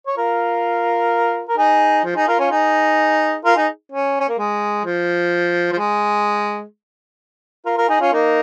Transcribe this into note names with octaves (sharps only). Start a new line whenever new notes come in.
C#5
F4 A#4
A#4
D#4 G#4
F3
D#4 G#4
F4 A#4
C#4 F4
D#4 G#4
F4 A#4
D#4 G#4
C#4
C#4
A#3
G#3
F3
F3
G#3
F4 A#4
F4 A#4
D#4 G#4
C#4 F4
A#3 D#4